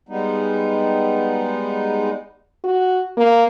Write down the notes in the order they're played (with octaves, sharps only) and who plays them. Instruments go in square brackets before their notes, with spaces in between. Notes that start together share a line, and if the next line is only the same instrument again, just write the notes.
[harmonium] G3 G#3 B3 D#4
[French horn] F#4
A#3